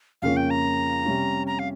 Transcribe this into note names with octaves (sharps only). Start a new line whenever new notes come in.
F2 C#3 F3 A#3 C#4 F5
G5
A#5
C3 G3 C#4
A#5
F5